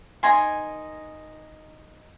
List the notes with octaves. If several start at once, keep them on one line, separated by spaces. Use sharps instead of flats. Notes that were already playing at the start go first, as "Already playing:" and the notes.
D#4 A#4 G#5 C6